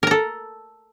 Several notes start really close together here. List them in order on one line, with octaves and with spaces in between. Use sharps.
A#4 A#5 A4